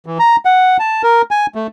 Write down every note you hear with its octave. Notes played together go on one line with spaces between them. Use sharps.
E3
A#5
F#5
A5
A#4
G#5
A3